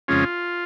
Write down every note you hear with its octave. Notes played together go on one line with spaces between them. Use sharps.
F2 C#3 G#3 C#4 F4